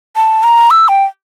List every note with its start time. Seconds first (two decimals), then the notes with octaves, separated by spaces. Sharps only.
0.16 A5
0.43 A#5
0.71 E6
0.88 G5